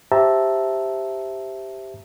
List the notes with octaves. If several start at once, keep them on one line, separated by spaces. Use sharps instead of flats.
G4 C5 E5 A5 A#5